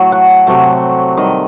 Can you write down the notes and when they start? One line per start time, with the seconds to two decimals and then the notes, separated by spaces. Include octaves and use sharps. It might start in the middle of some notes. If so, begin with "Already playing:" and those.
Already playing: A2 F#3 A3
0.12 F#5
0.47 C3 F#3 A3
1.17 D#3 G3 D#5